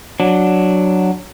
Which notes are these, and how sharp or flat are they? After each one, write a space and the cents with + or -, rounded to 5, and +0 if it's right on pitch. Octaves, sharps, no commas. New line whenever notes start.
F#3 +0 D4 +5